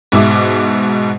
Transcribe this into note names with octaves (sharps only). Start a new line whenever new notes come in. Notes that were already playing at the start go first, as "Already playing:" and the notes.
G#2 B2 E5 D6